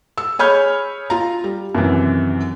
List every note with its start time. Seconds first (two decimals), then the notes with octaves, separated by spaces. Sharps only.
0.18 E6
0.39 G#4 C#5 B5 F6 G6
1.10 F4 A#5
1.44 G3
1.75 F#2 C3 D#3 E3